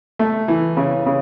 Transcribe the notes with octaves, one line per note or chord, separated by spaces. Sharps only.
A3
E3
C#3
C#3